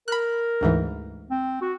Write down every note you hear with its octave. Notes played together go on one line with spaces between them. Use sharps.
A#4 B5 F#6
D2 G#2 E3
C4
F#4